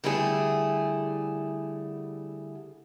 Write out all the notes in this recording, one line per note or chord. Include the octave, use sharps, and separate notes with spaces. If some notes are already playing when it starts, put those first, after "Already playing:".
D3 G3 A3 E4 G#4